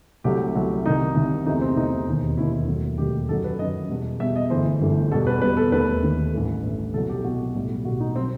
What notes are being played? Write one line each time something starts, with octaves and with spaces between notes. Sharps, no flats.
C2 C3 F#3 A3 G4
C2 C3 F#3 A3
C2 C3 D#3 D#4
C2 C3 D#3
E2 C3 E3 A3 D#4
C4
E2 C3 E3 A3 D#4
E1 D#2 D#3
E1 D#2 D#3 E4
E4
E1 D#2 D#3 F#3 A3
E1 D#2 D#3 F#3 A3 G4
F#2 D#3 F#3 A4
B4
F#2 D#3 F#3 D#5
E2 B2 G3
E2 B2 G3 E5
D#5
G1 G2 E3 A3 C5
G1 G2 E3 A3
E2 B2 G3 A4
B4
E2 B2 G3 B4
A4
D#2 D#3 A3 B4
D#2 D#3 A3
A1 G2 E3 A3
A1 G2 E3 A3
C2 B2 F#3 A4
G4
C2 B2 F#3 F#4
B1 A2 G3
B1 A2 G3 F#4
D#4
B2 F#3 C4